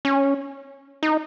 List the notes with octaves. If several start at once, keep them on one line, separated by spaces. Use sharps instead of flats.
C#4
D#4